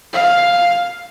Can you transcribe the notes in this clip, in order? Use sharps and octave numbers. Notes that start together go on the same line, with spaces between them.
F5